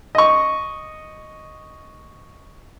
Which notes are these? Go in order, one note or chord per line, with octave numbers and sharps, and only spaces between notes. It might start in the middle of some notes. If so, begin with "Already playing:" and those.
D#5 C#6